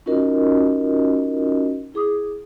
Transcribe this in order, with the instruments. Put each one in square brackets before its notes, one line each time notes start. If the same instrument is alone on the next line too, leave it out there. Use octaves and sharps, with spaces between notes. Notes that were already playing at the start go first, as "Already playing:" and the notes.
[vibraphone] C#4 D#4 F4 F#4 A#4 D#5
E4 G#4 D6 D#6